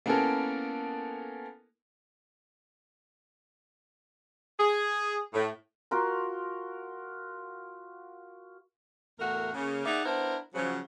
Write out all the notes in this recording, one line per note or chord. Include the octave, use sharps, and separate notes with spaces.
A#3 B3 C#4 E4 A4 A#4
G#4
A2
F4 F#4 A#4 C6
E2 A2 A3 F#4 A#4
C#3 A#3
A#3 D#4 G#4 D5 E5 F#5
B3 D4 E4 A#4 C5
C#3 F3 F#3